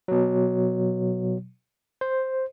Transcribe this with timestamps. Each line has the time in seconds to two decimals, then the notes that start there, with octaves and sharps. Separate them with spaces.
0.08 B2 F#3
2.01 C5